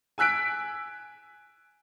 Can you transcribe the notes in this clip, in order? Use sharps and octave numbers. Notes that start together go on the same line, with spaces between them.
G#5 E6 F#6 B6 D7